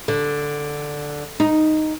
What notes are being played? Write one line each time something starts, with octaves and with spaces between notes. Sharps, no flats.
D3
D#4